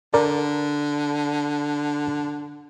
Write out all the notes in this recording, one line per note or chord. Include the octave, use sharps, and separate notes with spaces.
D3 A#4 D5